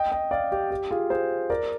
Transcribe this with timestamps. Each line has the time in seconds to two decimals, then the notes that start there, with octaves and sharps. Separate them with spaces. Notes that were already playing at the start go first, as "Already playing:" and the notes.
Already playing: D#5 G5
0.12 D#5 G5
0.31 D5 F5
0.52 G4
0.71 G4
0.91 F4 G#4
1.10 G#4 C5
1.50 A#4 D5